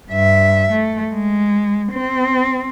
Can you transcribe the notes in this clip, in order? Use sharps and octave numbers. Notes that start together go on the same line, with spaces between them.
G2 E5
A3
G#3
C4